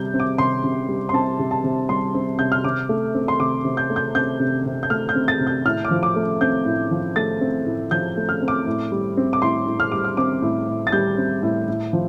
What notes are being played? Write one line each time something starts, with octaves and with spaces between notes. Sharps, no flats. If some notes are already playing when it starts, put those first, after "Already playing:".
Already playing: C3 G3 G6
C4
D6
C3 C6
C3
G3
C6
C4 A5
C3
A5
C3
G3 C6
C4
C3 G6
F6
C3 D6
A3
C4
C6
C3 D6
C3
G6
A3
G6
C4 G6
C3
C3
G6
A3 F6
G6
C4
A6
C3
G6
A2 F6
D6
F3
D6
A3
C4 G6
A2
F3
A3 A6
C4
A2
F3 G6
A3
F6
C4
D6
A2
G3
C4
D6
A2 C6
A2
F6
G3 D6
F6
C4 D6
A2
A2
A6
G3 G6
C4
A2
A2
F3